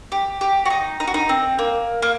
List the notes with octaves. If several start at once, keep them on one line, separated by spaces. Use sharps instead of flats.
G4
G4
F#4
D#4
D#4
F#4
D#4
C4
A#3
A#3